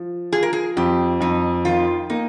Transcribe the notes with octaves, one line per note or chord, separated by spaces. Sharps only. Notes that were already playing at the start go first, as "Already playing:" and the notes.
Already playing: F3
F4 G#4
A#4
G#4
F2 G4
F2 D#4
D#3 F4
A#3 D#4